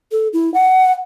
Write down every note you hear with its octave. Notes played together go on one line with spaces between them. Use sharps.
A4
E4
F#5